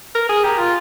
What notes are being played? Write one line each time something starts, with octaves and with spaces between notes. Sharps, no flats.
A#4
G#4
G4 A#4
F4